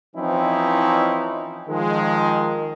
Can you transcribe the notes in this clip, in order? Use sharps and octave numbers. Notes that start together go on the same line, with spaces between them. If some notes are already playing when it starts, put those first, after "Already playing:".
E3 F3 C4 C#4 D#4 E4
D#3 F3 G#3